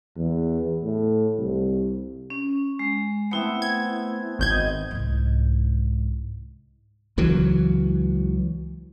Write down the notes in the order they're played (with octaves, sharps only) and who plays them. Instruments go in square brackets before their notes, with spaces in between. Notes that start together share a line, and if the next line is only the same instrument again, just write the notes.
[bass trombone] E2
A2
C2
[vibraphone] C#4
G#3
[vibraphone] A3 E4 E5 [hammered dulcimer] B3 C4
[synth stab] G#6
G#1 G6 G#6
[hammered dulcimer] D#5
[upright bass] C2 G#2
[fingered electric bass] C#2 E3 F#3